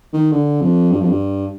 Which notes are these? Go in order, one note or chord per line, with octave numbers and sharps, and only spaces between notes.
D#3
D3
F2
G2
F2
G2